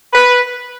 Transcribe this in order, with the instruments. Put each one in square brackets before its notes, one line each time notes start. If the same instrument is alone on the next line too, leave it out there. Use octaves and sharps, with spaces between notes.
[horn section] B4